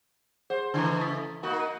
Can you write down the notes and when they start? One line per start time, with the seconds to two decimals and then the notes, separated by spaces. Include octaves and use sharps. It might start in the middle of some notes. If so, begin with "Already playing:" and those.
0.50 G#4 C5 F#5
0.74 C#3 E3 A3 D4 E4 A#5
1.01 D#6 A6 B6
1.43 A#3 D#4 F#4 A#4 C#6
1.60 D#7